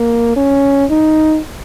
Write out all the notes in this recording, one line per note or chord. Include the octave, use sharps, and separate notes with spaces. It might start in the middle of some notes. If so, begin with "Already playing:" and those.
Already playing: A#3
C#4
D#4